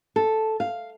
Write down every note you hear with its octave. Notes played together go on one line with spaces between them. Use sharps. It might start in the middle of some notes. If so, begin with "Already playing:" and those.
A4
F5